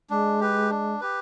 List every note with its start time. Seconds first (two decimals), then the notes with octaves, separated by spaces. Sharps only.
0.09 G#3 D4
0.40 G4 B4
0.70 D4
1.01 G4 B4